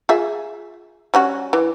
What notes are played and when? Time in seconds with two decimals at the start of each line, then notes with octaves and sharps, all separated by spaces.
0.09 F4 G#4 E5
1.14 G3 C#4 F#4
1.53 E3